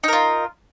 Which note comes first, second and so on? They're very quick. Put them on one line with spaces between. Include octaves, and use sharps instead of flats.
D#4 A#4 F4